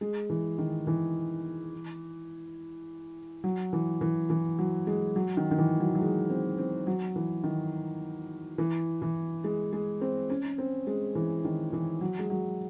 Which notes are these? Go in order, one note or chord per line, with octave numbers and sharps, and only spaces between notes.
G#3
E3
D#3
E3
F#3
E3
E3
E3
F#3
G#3
F#3
D#3
D#3
E3
F#3
F#3
G#3
C4
C4
F#3
E3
D#3
E3
E3
G#3
G#3
C4
C#4
C4
G#3
E3
D#3
E3
F#3
G#3
F#3